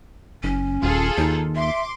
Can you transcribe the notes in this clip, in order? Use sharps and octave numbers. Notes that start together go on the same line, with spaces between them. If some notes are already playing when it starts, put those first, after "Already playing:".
F#1 C#4
D#1 F4 G#4 A4
D#2 D#4
E5 C6 D6